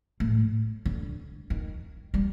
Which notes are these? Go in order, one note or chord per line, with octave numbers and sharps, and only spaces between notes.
A2
D3
D#3
G3